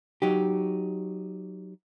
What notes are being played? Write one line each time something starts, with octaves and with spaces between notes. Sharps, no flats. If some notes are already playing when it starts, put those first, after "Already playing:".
F#3 D#4 G4